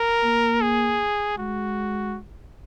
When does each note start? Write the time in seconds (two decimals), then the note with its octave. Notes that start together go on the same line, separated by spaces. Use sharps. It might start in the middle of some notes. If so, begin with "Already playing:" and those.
Already playing: A#4
0.24 A#3
0.61 G#4
1.38 G#3 F#4